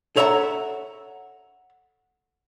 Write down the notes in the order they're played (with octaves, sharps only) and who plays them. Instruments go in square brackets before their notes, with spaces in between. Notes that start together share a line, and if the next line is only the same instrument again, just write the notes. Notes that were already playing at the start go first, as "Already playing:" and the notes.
[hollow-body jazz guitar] A4 C#5 E5 F#5 G#5 A#5